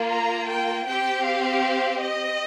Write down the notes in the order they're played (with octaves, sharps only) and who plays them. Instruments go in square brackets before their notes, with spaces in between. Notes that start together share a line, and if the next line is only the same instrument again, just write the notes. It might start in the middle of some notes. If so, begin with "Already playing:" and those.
Already playing: [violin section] A#3 F4
A#5
G5
C4 G4 G5
F5
D#5